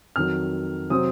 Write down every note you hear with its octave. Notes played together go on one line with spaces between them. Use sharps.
F2 D#3 F#3 F6
C3 F#3 C4 D#6